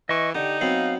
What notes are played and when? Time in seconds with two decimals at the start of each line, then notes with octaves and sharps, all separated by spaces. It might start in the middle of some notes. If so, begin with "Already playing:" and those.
0.09 E3 D#5 C#6
0.35 D3 D#4 G4
0.61 F#3 B3 C4 F5